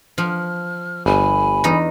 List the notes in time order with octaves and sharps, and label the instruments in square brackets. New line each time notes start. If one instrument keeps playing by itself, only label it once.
[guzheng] F3 [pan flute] F6
[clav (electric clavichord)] G1 [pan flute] G#5 [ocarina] B5
[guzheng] E2 D#4